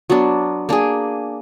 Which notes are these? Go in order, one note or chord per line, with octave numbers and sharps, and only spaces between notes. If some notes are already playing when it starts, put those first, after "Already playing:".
F#3 B3 D4
A#3 D4 G#4